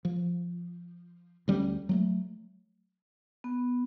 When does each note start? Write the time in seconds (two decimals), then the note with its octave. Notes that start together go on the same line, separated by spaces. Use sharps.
0.05 F3
1.48 D2 G3 C#4
1.89 F#3 G3 A3
3.44 B3